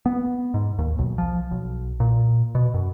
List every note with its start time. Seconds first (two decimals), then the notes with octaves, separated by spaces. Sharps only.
0.06 B3
0.54 G#2
0.79 D#2
0.99 B1
1.18 F3
1.51 B1
2.00 A#2
2.55 B2
2.74 F#2